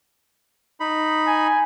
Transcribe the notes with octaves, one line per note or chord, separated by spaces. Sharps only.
D#4 B5
G#5